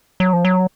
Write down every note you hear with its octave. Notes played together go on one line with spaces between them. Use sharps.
F#3
F3
F#3